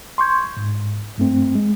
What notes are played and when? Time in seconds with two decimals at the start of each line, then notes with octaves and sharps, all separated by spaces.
0.18 C6 C#6 G6 G#6
0.57 G#2
1.18 G2 A3 C4
1.55 G#3